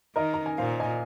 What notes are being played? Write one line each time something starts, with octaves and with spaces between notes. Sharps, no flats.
D#3 A#4 D#5
A#5
G#5
A#2 C5 F5
D#5 G#5